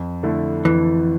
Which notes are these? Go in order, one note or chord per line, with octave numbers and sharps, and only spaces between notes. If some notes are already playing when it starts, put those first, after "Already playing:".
Already playing: F2
D3 A3 E4
F2 E3